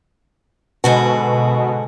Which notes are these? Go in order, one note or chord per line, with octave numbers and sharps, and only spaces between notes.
G#2 B2 D3 F#4